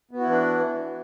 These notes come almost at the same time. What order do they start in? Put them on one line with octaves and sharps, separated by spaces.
B3 F#4 E4 E3 D4